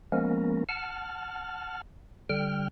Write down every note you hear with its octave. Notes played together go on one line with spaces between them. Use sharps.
F3 G#3 A#3 B3 C#4 A#4
F#5 A5 F6
D3 G3 G5 F6